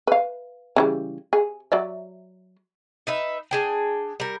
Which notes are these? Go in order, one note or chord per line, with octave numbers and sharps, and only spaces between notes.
B4 F5
C#3 E3 G3
G#4
F#3 D5 E5
D#4 B4 E5
D4 G#4 G5
G3 A#4